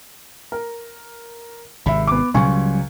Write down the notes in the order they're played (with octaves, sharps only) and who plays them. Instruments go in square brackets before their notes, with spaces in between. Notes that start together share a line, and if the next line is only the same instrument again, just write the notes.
[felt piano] A#4
[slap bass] G#1 C3 [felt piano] E5 B5
[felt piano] B3 D6
[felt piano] C#2 G#5 C#6 [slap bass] F#3 G3